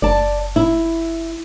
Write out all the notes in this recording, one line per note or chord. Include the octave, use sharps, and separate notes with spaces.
F#1 D5 A5
E4